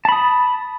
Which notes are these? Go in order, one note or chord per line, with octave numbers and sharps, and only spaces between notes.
A5 B5 D#6